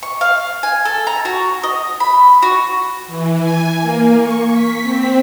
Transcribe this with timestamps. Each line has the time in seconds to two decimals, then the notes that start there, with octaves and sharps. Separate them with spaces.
0.03 C#6
0.21 F5
0.63 G#5
0.85 A4
1.07 A#5
1.25 F#4
1.63 D#5
2.00 B5
2.42 F#4
3.08 E3
3.39 G#5
3.81 A#3
4.20 C#6
4.51 B6
4.83 C4